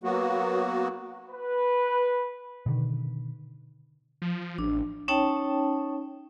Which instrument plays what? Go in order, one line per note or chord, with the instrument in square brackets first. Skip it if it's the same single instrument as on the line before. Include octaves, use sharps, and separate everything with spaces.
[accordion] F#3 A#3 B3 F#4
[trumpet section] B4
[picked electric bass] B2 D3 D#3
[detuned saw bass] F3
[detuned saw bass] A1 [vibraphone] D4
[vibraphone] C#4 D#4 C#5 G5 A5